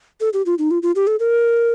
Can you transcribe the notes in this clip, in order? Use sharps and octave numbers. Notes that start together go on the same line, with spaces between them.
A4
G4
F4
D#4
F4
F4
G4
A4
A#4